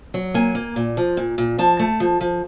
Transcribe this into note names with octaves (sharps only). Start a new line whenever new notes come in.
F#3
A#3 G#5
A#3
A#2
F3
A#2
A#2
F3 A5
A3
F3
F3